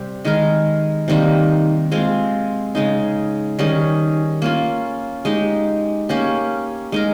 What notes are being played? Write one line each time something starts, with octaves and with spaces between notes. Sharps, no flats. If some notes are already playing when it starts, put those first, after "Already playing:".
Already playing: C3 G3 C4
D#3 G#3 D#4 A#4
C3 D#3 G3 A#3
G#3 C4 F4
C#3 G#3 D#4
D#3 G3 C#4 G#4
A#3 C#4 F4
G#3 D#4 G4
A#3 C#4 G4
G#3 D#4 A#4